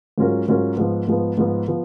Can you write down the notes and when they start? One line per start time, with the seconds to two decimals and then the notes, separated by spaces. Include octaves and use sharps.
0.18 G#2 F#3 C#4 F4 A#4
0.48 G#2 F#3 C#4 F4 A#4
0.77 G#2 F3 B3
1.07 G#2 F3 B3
1.38 G#2 F3 B3
1.68 F3 B3